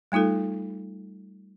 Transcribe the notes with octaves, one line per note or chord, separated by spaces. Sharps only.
G3 A3 D#4 F4 A4